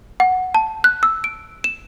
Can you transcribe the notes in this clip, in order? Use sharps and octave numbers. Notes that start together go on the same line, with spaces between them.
F#5
A5
F#6
E6
D7
E7